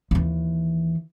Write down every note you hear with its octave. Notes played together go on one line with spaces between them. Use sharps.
D#2 E3